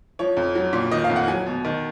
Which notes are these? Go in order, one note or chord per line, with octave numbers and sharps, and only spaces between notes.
F3 C#5
F2
F#3
A#2
D#3 D#5
F5
F2
F#5
F#3 G#5
B2
D#3